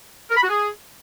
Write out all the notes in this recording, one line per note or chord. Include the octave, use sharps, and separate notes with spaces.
A#4
B5
F#4
G#4